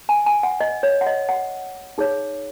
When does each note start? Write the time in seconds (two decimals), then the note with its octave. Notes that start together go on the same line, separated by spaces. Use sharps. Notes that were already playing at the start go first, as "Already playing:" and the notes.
0.09 G#5
0.26 G#5
0.43 F#5
0.60 D#5
0.83 C#5
1.01 F#5
1.07 D#5
1.29 F#5
1.98 D#4 G#4 C#5